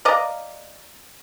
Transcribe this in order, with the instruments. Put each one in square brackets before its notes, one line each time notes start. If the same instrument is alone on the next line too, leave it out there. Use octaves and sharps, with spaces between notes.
[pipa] D5 D#5 F5 A#5